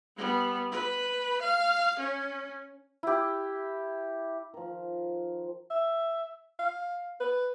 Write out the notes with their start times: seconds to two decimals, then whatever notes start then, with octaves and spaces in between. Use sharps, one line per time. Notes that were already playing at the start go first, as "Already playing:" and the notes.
0.17 G3 B3
0.72 B4
1.42 F5
1.99 C#4
3.03 E4 G4
4.54 D#3 F3
5.70 E5
6.59 F5
7.20 B4